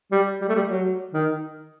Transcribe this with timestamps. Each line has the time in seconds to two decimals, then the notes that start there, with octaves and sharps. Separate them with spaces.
0.12 G3
0.41 G3
0.49 A3
0.55 G3
0.69 F#3
1.13 D#3